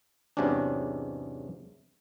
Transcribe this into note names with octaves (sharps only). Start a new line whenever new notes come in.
E2 G#2 C3 F#3 C#4 D4